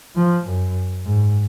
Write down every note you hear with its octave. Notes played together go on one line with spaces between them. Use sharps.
F3
F#2
G#2